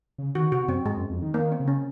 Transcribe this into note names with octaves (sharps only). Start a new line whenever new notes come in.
C#3
D#3 F#4
C3 F#4
F#2 C4
G#2 G#3
F#2
F2
D#3
D#3 A#3
C4
C#3
C#4